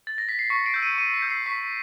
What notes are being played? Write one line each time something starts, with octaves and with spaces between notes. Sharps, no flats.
A6
A#6
B6
C7
C#6 B6 C#7
C7 D7
E6 G6
C#7 D#7
C#6 C#7 D#7
B6 C#7
E6 G6
C7
C#6 B6